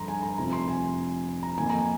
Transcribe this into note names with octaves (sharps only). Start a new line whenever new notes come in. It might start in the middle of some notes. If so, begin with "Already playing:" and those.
Already playing: G1 F2 D3 A#5 C6
G#5
A#5
F1 F2 C3 F3 A#5
C6
G#5
A#5
F2 D#3 A#3 G#5
A#5
G#5